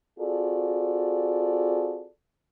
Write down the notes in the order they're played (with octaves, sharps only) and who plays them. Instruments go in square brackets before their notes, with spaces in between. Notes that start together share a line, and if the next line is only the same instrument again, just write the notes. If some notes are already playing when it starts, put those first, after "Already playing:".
[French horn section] C4 F4 F#4 G#4 A4 D5